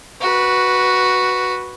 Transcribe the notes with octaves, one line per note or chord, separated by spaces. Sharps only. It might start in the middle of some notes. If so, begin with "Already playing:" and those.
F#4 B4